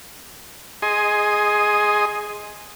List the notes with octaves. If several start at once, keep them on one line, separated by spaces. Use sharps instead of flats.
G#4 D#5 G#5 C6 D#6